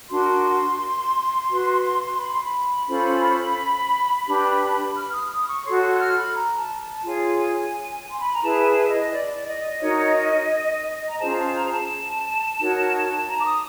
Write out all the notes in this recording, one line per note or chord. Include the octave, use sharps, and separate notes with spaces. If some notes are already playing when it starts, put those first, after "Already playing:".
D4 F#4 A#4 C6
F#4 B4
B5
C6
B5
C#4 F4 A4 C5
D4 G4 B4
F6
D#6
D#6
C#6
F#4 A4 C#5 C6
C6
F#6
F6
C6
B5
A#5
A5
A5
F4 G#4 C#5 G#5
C6
B5
A#5
E4 G#4 B4 A5
G#5
A5
D#5
D5
D#5
D#4 F#4 A#4 C#5
A#5
C#4 F4 G#4 C5 A5
A#5
A5
A#5
A#5
A5
D#4 F#4 A#4 C#5
A#5
D6
D#6